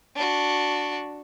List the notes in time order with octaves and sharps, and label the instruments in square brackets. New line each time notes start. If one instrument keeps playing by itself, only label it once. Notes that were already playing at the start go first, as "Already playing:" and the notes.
[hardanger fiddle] D4 F#4